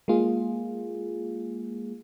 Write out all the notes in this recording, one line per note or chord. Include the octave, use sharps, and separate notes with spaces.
G#3 A#3 F4 G#4